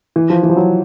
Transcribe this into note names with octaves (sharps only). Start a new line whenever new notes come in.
E3
F3
E3
F3
F#3